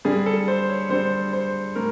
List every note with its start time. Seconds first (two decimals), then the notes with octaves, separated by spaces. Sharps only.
0.05 D3 G3 G#4
0.26 A4
0.48 C5
0.69 C#5
0.89 D3 G3 C5
1.33 C5
1.75 A2 A#4